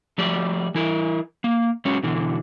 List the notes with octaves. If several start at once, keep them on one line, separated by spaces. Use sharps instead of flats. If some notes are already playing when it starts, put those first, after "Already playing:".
F3 A3 G4 D5
E3 E4 A#4
A#3
F#3 G#3 C#4
B2 D3 E3